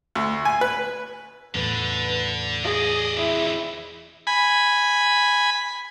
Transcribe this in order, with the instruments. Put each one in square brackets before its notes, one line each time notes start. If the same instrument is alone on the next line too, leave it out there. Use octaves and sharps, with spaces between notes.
[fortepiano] D2
G#5
B4
[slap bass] E2 A2 [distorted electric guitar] D3 [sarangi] B4
[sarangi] G#4 [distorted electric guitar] D5 D#5
[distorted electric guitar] E3 C4 [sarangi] E4
[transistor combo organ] G#5 B5